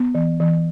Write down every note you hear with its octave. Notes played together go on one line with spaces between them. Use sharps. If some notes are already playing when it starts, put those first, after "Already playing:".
Already playing: B3
E3
E3